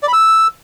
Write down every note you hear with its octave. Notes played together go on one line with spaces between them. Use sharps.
D5
B5
E6